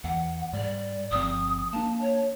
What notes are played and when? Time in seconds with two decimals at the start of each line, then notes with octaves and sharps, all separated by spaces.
0.04 E2 E3 F#5
0.53 G#2 G3 D5
1.11 G1 F3 C4 D#6
1.73 A#3 D4 A5
2.01 C#5